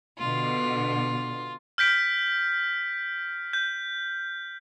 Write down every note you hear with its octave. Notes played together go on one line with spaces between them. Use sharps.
B2 D3 F4
F6 G6 B6 D7
G6